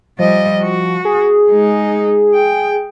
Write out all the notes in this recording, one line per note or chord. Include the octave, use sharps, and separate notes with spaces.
F3 G3 D#5
F#4
G#4
G#3 D#4
G5